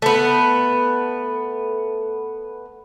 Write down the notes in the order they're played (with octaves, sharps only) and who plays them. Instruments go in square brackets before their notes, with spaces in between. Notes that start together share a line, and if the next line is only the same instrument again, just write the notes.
[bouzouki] A3 B3